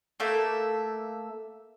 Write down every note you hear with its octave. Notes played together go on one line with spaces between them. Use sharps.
A3 A#3 E5